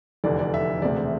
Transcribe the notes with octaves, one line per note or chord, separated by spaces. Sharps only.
F1 E2 D3 D5
D5
E5
E1 D2 C3 D5
E5